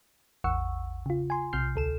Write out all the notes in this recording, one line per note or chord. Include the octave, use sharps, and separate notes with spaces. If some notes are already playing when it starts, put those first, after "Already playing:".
A1 E2 F#5 C#6 E6
C#3 F4
G#5 C6
B1 C3 F6 G6 C7
D2 A4 E7